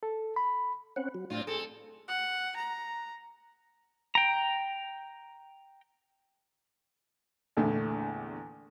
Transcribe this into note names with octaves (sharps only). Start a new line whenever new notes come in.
A4
B5
C4 C#4 F#5
F#3
A2 C3 C4 D4 F4
C4 G#4 A4
F#5
A#5
G5 A#5
A#1 E2 D3 E3 A3